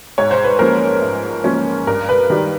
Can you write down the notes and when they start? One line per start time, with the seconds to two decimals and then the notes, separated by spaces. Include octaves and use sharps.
0.18 G#2 C#5
0.31 C5
0.44 B4
0.59 F3 A#3 C#4 A#4 C5
1.02 G#2
1.44 F3 A#3 C#4
1.87 G2 A#4
2.09 B4
2.30 D#3 G3